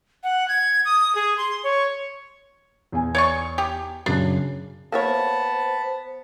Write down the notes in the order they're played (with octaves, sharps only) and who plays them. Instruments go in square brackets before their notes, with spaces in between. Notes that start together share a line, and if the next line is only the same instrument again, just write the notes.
[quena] F#5
G#6
D#6
G#4
C6
C#5
[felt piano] E2 G#5
[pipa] C#5 D5 C#6
G4
[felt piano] F#2 C#3 [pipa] D4
[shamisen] A#3 E4 C#5 [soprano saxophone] B3 [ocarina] C5 [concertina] A5